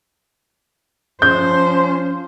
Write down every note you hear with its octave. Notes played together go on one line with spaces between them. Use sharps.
F3 C#4 C5 G6